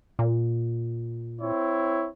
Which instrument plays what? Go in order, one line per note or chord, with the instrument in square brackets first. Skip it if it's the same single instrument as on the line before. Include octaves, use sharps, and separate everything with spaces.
[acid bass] A#2
[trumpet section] C4 E4 C#5